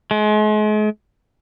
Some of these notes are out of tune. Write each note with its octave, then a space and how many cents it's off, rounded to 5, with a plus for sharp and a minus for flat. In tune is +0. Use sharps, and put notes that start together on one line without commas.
G#3 +40